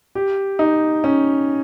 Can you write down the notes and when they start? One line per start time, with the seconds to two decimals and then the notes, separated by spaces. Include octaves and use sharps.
0.15 G4
0.59 D#4
1.04 C#4